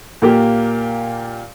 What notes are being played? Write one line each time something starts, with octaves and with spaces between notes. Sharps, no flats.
A#2 A#3 G4